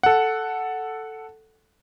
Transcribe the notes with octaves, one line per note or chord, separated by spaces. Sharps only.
A4 F#5